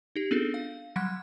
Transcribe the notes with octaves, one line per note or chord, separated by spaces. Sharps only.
D#4 G4
B3 C4 D4 F4 G#4 A4
F5
F#3 G3 F#5 F#6 G#6